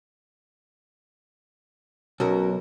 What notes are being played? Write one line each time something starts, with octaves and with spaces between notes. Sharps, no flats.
B1 C#4 F#4 A#4